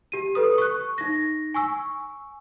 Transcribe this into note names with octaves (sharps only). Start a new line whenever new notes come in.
G4 D#7
A4 B4 D#6
C#6 F#6
D#4 A#6
G#5 C#6 E6